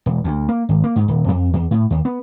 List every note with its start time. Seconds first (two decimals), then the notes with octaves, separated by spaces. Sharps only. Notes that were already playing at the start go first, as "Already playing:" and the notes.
0.06 E1
0.24 D2
0.49 A#3
0.69 G#1
0.84 A#3
0.96 G#2
1.08 D#1
1.28 F2
1.53 E2
1.71 A2
1.90 D#2
2.05 B3